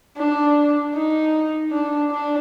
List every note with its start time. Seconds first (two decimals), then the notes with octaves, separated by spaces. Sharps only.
0.17 D4
0.94 D#4
1.71 D4
2.11 D4